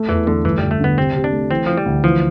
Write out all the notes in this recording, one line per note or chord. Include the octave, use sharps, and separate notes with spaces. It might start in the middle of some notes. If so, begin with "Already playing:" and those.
Already playing: A3
E2 E3
D3 A3
G1 E3
G1 G3
A3
D3 B3
C3 C4
C3
D4
A3
E3 C4
E3 F3
G3
D2
E3 F3